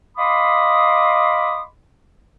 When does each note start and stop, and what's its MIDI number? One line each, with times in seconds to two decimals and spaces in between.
0.18 1.62 75
0.18 1.62 77
0.18 1.62 83
0.18 1.62 84
0.18 1.62 86
0.18 1.62 87